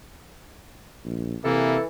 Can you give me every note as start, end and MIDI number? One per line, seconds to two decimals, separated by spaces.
1.05 1.36 34
1.44 1.77 48
1.44 1.86 52
1.44 1.77 58
1.44 1.83 69